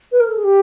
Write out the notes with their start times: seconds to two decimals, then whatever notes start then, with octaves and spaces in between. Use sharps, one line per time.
0.12 B4
0.20 A#4
0.27 A4
0.36 G#4
0.44 G4